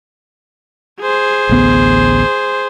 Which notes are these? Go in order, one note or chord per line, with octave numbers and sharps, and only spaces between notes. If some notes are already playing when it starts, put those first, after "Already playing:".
G#4 C5
A1 D2 B3